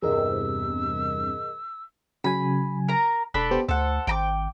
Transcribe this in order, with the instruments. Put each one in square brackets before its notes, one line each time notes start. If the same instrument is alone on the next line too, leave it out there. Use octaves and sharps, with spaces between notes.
[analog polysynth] E2 G2 C3 [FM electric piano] G#4 A#4 D#5 [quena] E6
[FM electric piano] C#3 F#3 G#5 [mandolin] B5
[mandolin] A#4 A#5
[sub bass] E1 [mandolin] D4 A4 B5 [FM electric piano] F#6
[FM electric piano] B3 G4 C5
[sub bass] D2 [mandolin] A4 F#5 [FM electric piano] C5
[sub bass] G#1 [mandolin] G5 A#5 D6